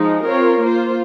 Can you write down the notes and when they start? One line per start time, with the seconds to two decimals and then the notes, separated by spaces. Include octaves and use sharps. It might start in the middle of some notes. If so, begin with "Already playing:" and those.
Already playing: F3 G#3 D#4
0.26 C4 F4 A#4 C#5
0.60 A#3 F4 C5